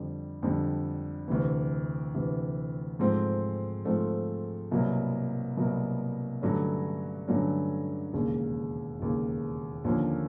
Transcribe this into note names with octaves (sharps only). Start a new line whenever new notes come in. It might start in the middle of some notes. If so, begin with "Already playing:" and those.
Already playing: F2 D3 G3
F2 D3 G3
D2 C3 E3
D2 C3 E3
G#2 F3 A3 C4
G#2 F3 A3 C4
C2 B2 F#3 A#3
C2 B2 F#3 A#3
G2 D3 F#3 A3 C#4
G2 D3 F#3 A3 C#4
E1 D#2 C#3
E1 D#2 C#3
D#2 D3 F3 A#3 C#4